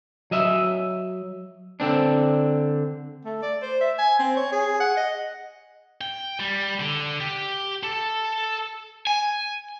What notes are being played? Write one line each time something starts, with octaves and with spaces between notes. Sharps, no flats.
F#3 D#5 E5
D3 C4 D4
A3
D5
C5
E5
G#5
C4
C#5
G#4
F#5
D#5
G5
G3
D3
G4
A4
G#5